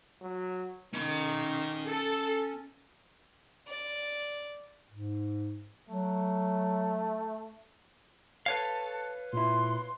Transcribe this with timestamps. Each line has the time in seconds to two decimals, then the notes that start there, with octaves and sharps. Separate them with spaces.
0.21 F#3
0.94 D#3 C#4 B5
1.87 A4
3.67 D5
4.91 G#2
5.89 F#3 A3
8.46 A4 B4 C#5 F5
9.33 A#2 E4 C6